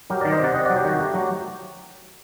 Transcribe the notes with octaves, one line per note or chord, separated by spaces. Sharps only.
F#3 G4 A#4
D#3 A#4 D5
C5 D#5
C3 D5 F#5
C3 D#5 G5
F#3 D5 F#5
G4
D#3 F#4
A3 G4
F#3